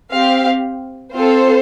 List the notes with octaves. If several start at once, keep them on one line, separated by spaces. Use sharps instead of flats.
C4 G4 F5
C4 F4 A4 C5